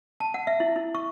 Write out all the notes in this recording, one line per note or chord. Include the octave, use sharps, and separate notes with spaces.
A5
F#5
E5
E4
E4
C#6